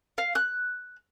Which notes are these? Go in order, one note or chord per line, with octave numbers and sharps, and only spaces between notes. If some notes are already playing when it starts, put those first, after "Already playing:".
F5
F#6